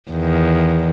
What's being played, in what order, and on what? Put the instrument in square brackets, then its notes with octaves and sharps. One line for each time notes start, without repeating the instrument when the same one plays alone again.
[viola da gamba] E2 D#3